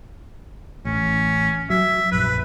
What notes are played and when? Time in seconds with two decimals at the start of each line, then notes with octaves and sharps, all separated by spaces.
0.85 A1 C#4
1.70 F#3 E5
2.12 A#1 F#2 B4